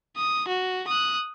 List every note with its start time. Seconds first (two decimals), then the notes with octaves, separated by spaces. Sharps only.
0.17 D#6
0.48 F#4
0.88 D#6 F#6